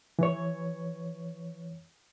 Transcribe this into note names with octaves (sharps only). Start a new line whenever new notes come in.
E3 C#5